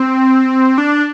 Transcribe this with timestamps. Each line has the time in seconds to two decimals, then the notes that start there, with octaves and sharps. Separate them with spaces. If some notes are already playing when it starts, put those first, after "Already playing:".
Already playing: C4
0.78 D4